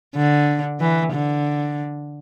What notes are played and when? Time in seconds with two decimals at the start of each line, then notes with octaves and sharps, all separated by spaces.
0.16 D3
0.80 E3
1.13 D3